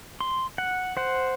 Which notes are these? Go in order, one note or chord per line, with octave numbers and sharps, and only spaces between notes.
C6
F#5
C5 F#5